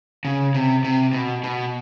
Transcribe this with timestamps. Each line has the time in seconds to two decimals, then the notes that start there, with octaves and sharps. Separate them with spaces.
0.25 C#3
0.54 C3
0.85 C3
1.13 B2
1.44 B2